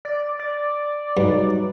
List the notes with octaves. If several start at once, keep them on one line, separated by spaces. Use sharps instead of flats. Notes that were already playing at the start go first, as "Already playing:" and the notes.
D5
D5
G2 F#3 D#4 B4